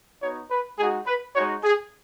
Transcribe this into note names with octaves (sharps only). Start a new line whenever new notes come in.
B3 D#4 F#4 C#5
B4
G#3 D#4 F#4 G#4
B4
G#3 D#4 F#4 C#5
G#4